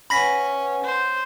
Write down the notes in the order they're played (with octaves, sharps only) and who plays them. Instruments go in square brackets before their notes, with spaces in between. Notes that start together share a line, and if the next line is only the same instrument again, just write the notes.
[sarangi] C#4 [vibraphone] B4 F#5 G#5 [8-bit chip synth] B5 A#6 B6
[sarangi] C5